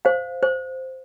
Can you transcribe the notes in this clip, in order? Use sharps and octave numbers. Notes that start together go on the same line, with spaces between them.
C5 F5
C5